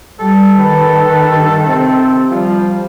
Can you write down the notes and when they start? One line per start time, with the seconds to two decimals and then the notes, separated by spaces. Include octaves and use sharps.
0.20 G3 A4
0.57 D#3 B4
1.30 G2
1.66 C3 C4
2.30 F3 G3